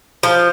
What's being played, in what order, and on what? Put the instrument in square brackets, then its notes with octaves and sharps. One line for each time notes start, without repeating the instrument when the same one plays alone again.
[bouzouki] F3